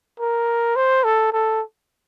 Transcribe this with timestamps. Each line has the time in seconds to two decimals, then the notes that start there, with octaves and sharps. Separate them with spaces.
0.20 A#4
0.76 C5
1.04 A4
1.32 A4